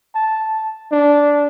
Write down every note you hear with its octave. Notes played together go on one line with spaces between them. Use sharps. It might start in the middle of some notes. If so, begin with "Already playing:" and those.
A5
D4